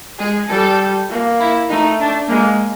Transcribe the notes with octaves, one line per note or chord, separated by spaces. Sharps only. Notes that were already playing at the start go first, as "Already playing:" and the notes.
G#3 G#4
G3 A4
A#3
E4
A3 D#4
D4
G#3 A#3